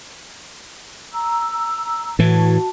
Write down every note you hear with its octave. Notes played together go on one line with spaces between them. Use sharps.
A#5 E6
A2 E3 F#4 A5